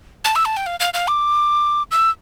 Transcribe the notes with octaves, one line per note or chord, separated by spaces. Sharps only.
A5
E6
A5
G5
F5
F5
F5
D6
E6